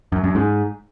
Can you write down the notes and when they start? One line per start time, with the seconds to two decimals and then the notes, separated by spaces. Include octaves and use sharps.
0.12 F#2
0.24 F#2
0.35 G#2